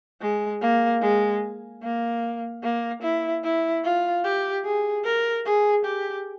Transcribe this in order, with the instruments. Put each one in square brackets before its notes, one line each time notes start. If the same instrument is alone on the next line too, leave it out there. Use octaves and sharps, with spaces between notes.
[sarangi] G#3
A#3
G#3
A#3
A#3
E4
E4
F4
G4
G#4
A#4
G#4
G4